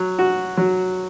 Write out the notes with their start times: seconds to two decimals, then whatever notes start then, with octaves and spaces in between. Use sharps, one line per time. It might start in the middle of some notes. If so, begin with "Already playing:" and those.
Already playing: F#3
0.19 F#4
0.57 F#3